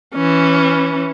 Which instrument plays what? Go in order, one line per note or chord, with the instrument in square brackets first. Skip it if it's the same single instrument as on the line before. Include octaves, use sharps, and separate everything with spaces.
[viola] E3 C#4